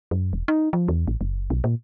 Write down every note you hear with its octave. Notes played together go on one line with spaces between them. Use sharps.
F#2
E1
D#4
F3
E2
A1
F#1
B1
A#2